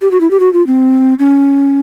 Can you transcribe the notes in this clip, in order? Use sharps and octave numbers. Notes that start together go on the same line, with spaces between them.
G4
F#4
E4
G4
F#4
F4
C4
C#4